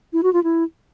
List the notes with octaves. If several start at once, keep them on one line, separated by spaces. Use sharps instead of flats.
E4
F#4
F4
E4